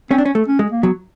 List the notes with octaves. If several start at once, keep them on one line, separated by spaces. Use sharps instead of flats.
C4 C#4
D4
C#4
A3
C#4
G#3
A#3
F#3 B3